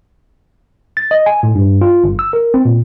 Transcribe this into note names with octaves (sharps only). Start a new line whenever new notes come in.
A6
D#5
G#5
A2
G2
F4
G1
E6
A#4
C4
A#2